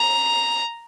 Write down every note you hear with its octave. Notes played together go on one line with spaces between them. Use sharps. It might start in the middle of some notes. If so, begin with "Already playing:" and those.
Already playing: A#5